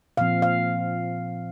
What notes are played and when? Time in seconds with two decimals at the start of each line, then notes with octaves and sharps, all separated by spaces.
0.17 A#2 F3 C4 F5
0.42 F5